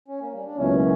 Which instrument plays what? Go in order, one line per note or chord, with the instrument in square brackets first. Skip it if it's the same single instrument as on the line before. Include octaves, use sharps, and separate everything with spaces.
[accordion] C#4
A#3
G3
D4
[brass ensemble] C#2 B2 F#3 A#3 C#4 [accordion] E4